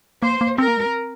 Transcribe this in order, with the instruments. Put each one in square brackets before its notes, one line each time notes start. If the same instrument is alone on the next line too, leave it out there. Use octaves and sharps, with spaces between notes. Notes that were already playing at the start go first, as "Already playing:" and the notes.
[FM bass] A#3 [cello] C5
[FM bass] A#3
[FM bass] C4 [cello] A#4
[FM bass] A#3
G#3
C4